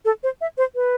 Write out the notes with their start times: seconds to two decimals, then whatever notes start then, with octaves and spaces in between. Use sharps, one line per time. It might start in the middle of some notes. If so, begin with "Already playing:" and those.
0.05 A4
0.23 C5
0.41 E5
0.58 C5
0.75 B4